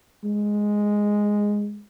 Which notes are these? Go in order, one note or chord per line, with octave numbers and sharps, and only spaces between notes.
G#3